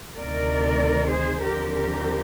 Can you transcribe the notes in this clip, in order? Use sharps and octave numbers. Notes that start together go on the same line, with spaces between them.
D2 C3 D#3 A#4 D5
G#4 C5
D#2 D3 F3 C4 G4 A#4
G4 A#4